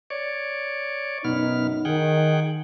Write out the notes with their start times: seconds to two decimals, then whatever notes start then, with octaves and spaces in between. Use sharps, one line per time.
0.10 C#5 D5
1.25 F#2 B2 B3 D#4 F6
1.85 D#3 G#4 F#5 G5